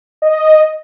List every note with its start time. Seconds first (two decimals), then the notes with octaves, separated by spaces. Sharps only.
0.22 D#5